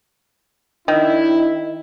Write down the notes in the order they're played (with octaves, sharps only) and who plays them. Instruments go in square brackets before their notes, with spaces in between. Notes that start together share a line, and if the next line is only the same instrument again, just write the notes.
[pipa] D#3 [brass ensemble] D4 E4